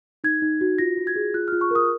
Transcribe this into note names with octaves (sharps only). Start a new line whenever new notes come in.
D#4 G#6
D#4
F#4
F4 A#6
F4
G#6
G#4
F4 F#6
F4 F6
C#6
A#4 D#6